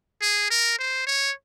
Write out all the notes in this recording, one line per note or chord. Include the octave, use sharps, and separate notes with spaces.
G#4
A#4
C5
C#5